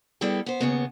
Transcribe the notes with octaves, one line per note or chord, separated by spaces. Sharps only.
G3 B3 E4 G#4 A4 G5
B3 C5
D#2 C#3 B3